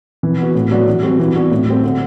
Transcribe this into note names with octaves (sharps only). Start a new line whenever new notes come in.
E3
B3 F#4
A2
F#3 B3 D4 F#4
E3
G3 C4 F#4
E3
B3 D4 F#4
A2
G3 C4
D3